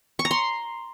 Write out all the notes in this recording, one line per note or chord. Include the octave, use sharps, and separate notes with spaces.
C#6
A#5
C6